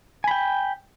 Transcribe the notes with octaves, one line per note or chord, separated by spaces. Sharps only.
G5 G#5 B5